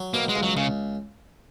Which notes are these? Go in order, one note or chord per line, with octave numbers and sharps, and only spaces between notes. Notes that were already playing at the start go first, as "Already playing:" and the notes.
Already playing: F#3
B2 A#3
G#3
C#2
F#3
C#2 C#3